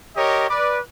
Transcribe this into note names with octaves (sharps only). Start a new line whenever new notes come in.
G4 A#4 C#5 D#5
B4 D5